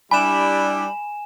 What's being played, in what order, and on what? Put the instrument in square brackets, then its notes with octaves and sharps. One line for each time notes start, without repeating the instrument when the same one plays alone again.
[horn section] G3 D4 E4 [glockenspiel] G#5 E7 [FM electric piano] B5